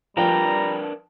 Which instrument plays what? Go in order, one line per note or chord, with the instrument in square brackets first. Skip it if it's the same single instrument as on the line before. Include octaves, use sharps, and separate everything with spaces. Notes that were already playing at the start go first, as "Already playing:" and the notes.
[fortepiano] F3 G5 [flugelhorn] G3 [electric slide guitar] D4 A#4 B4 [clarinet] A#5